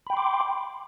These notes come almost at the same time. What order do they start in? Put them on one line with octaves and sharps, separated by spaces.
B5 G5 C6 D6